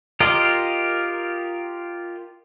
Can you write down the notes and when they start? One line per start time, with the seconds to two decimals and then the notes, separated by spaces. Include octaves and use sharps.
0.20 F4 G4 A#4 D#5